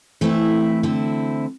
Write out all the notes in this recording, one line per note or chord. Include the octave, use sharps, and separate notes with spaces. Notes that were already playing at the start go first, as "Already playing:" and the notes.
E3 A3 C4 E4
D3 C4 E4